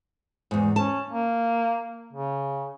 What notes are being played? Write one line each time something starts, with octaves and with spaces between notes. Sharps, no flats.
E2 G#2
C#4 A5
A#3
C#3